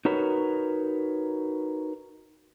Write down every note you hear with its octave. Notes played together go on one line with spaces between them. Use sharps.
D#4 F#4 A#4 B4 C#5